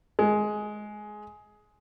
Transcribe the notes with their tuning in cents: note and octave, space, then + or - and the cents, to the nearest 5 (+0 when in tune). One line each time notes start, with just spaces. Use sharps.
G#3 +15